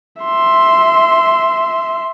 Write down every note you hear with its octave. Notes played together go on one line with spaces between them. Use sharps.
E5 C6